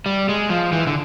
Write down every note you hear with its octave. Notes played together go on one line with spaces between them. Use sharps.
G3
G#3
F3
E3
D3